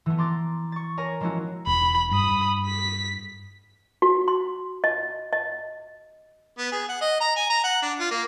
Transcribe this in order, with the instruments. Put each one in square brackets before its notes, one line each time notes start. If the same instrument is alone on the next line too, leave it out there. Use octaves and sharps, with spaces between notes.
[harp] E3 A3 B3
A#5 C6 D6 A6
C#6 A6
A#4 C#5 G#5 A#5
F3 G#3 A#3 C#4 E4 F#4
[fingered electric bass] E1 [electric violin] B5
[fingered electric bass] G2 [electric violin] B5 D#6
[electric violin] B6
[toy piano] F#4
C6
D#5
D#5
[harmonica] B3
G#4
F#5
D#5
A#5
G#5
A#5
F#5
D4
F4
A#3